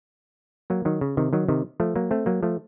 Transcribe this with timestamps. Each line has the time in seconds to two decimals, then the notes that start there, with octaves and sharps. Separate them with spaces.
0.70 F#3 A#3
0.85 D#3 F#3
1.01 C#3
1.17 C3 D#3
1.33 D#3 F#3
1.49 C3 D#3
1.80 F3 A3
1.96 F#3 A#3
2.11 A3 C4
2.26 F#3 A#3
2.43 F3 A3